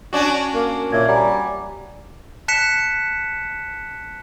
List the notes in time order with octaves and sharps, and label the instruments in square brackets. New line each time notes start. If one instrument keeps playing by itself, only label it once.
[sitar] C#4 D4 F#4
[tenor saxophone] A#3
[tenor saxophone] A#2 [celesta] C#5 E5 G#6
[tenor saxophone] G3 [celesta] F#5 G#5 A#5
[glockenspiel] A5 F#6 B6 C#7 E7